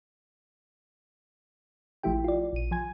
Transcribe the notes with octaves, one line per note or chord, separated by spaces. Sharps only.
A1 F3 A3 E4 G4 G5
F4 D5
A#1 D#7
F3 G#5 G#6